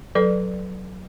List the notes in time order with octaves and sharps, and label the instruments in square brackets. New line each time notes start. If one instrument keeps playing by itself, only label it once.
[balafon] F#3 A4 B4 D5